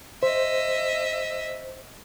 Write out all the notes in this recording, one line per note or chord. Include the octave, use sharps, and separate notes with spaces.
C5 D#5 E5